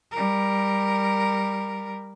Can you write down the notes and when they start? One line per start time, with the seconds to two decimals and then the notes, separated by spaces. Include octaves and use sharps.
0.12 G3 A#4